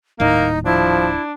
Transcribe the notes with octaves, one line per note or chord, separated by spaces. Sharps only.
D#1 D#2 A2 A#3 D#4
F3 D4 E4